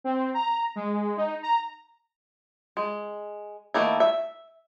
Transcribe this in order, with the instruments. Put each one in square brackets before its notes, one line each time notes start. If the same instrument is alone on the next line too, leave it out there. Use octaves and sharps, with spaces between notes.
[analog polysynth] C4
A#5
G#3
D#4
A#5
[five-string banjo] G#3
D#3 A3 A#3 E4
E5